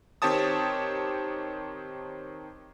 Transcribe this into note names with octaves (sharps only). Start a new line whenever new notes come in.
D#3 C4 G4 C#5 A5 D#6